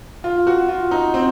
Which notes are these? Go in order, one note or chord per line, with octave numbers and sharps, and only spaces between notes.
F4
F#4
F4
D#4
C4